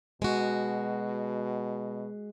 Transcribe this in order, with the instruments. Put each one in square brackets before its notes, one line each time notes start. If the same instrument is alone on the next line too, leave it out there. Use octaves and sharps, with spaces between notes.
[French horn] B2 [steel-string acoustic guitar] G#3 F#4